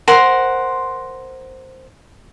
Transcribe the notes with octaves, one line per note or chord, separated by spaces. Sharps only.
A#4 C5 F#5 C6